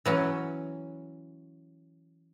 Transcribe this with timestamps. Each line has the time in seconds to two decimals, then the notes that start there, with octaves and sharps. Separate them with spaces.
0.06 E3 F#3 C#4